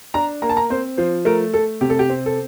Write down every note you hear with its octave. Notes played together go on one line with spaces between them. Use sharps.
D4 A#5
A#3 A#5
A5
A#5
C4 C5
F3 C5
A3 A#4
A3 A4
C3 G4
A4
G4
C4
A4